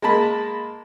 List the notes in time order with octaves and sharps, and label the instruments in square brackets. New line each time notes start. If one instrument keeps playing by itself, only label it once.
[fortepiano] G#3 A#3 A5 B5